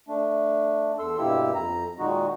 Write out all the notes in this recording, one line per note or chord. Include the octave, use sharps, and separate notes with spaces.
A3 D4
E2 A4 C6 E6
G2 B2 A#3 E4 G4 E6
F2 A#5
A#2 D#3 G#3 D#4 F#4